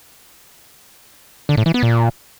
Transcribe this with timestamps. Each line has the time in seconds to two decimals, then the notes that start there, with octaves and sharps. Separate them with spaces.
1.49 D3
1.57 A2
1.66 E3
1.74 B3
1.83 A#2